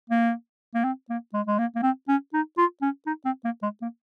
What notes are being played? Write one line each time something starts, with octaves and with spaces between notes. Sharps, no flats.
A#3
A#3
C4
A#3
G#3
G#3
A#3
A#3
C4
C#4
D#4
F4
C#4
D#4
C4
A#3
G#3
A#3